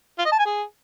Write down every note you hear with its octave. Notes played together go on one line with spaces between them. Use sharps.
F4
D#5
A5
G#5
G#4